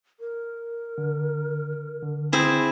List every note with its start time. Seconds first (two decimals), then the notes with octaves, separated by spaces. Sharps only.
0.20 A#4
0.98 D3
2.02 D3
2.32 C4 E4 G#4